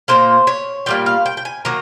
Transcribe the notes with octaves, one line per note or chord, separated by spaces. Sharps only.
A#2 G3 A#3 C5
C#5
A#2 G3 A#3 G5
F5
G5
G5
G#5
D#3 F#3 A#3 A#5